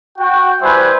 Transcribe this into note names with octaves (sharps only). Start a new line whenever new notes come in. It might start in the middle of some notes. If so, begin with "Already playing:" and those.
F#4 G5
G3 E4 B4 C5 E5 G#5